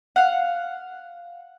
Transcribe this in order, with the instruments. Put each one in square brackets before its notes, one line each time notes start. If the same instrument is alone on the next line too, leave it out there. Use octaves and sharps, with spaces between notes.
[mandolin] F5 F#5